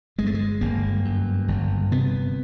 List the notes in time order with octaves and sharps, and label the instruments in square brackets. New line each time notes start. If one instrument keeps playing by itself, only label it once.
[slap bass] G1 G#3
A3
G#3
G1 A#3
F#2
G1
C3 B3